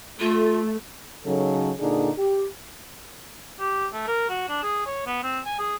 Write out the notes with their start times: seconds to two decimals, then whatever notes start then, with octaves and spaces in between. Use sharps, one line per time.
0.20 A3 F4
1.25 C#3 F#3 D#4 A4
1.79 A#2 D3 D4 D#4 G#4
2.18 G4
3.60 G4
3.93 A3
4.07 A#4
4.29 F#4
4.49 D4
4.63 G#4
4.86 C#5
5.07 B3
5.23 C4
5.45 G#5
5.59 G#4